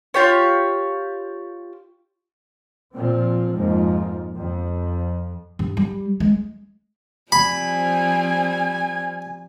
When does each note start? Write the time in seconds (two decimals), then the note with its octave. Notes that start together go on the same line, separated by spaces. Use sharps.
0.14 F4 G4 C#5
2.95 A#2 F3 C4
3.55 F2 G#2 F3 A#3
4.38 F2
5.59 G2
5.77 G3
6.20 G#3
7.32 F3 G3 C4 G#5 B5